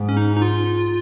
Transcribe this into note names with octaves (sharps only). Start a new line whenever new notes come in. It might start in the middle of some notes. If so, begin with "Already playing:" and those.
Already playing: G#2
C#4
D#4
D#4
F4